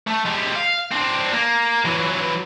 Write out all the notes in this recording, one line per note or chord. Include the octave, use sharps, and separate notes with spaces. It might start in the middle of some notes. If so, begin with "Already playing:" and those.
A3
G#3 G4
F5
C4 D4
A#3
E3 F#3